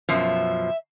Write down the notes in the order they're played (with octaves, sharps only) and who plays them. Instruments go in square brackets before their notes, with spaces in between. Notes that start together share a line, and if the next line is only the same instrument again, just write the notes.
[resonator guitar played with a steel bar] F#2 B2 F3 [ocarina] E5